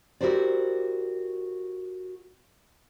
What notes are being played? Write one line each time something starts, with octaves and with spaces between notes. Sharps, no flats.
E4 F#4 G4 A#4 C5 D5